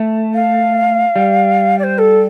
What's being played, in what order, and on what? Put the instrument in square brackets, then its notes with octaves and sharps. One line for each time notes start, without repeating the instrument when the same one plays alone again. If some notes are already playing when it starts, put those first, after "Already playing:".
Already playing: [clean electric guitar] A3
[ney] F5
[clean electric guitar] G3
[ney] D5
C5
A4